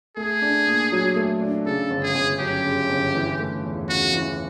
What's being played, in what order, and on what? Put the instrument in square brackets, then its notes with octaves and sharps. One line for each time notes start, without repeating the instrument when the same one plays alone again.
[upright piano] A3 [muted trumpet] G#4
[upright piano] D4
A#2
F#3
A3
D4
[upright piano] C#3 [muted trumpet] A4
[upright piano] G1
[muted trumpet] G#4
[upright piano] G1
[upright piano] F#2 [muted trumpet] G4
[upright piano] C#3
G1
E3
A3
E2
[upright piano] C#3 [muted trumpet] F#4
[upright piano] E3